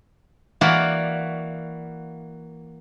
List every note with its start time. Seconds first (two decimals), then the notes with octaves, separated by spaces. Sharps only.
0.61 E3 A#3 F#4 A#4 D5